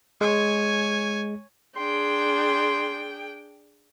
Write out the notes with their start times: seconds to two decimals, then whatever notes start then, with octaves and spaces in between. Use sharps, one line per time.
0.21 G#3 C#5 G#5
1.77 D4 G#4 G5 C6